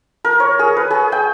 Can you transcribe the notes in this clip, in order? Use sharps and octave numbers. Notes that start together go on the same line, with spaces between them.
A#4
C#5
G#4
B4
G#4
G5